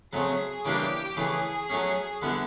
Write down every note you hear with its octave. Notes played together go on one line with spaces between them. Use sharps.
C#3 F#3 A3 C4 G#4
C#3 E3 G3 A#3 D4 G4
C#3 E3 A3 G#4
F#3 A3 C#4
D3 G3 B3 E4